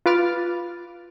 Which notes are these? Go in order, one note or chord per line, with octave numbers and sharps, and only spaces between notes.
F4 B4 D6 F6 A6